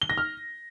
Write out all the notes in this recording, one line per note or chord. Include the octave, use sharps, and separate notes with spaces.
G7
A#6
F6